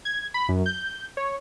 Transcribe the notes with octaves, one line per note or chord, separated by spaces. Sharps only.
G#6
B5
F#2
G6
C#5